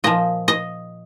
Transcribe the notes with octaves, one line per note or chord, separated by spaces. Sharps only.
A#2 F3 D#5
D#5